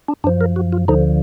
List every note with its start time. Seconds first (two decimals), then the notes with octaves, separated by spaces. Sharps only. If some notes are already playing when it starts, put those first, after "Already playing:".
0.08 D4
0.24 F#2 D4
0.27 F3
0.41 A#4
0.56 F#4
0.73 F4
0.88 D2 D3 F3 D#4